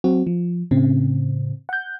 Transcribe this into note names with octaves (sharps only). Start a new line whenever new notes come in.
F#3 C4 F#4
F3
A2 C#3 C4
F#5 G6